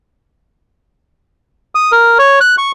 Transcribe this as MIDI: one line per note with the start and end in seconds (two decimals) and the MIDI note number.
1.75 1.92 87
1.92 2.18 70
2.18 2.39 73
2.41 2.56 90
2.58 2.72 85